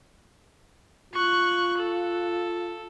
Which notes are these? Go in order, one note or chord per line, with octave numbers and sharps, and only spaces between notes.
F4 C#6 F#6
A4